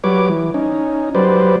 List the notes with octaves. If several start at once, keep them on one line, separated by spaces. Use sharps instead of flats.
F#3 G3 B4 C#5 D6
E3
C#4 D#4
F#3 G3 B4 C5 D5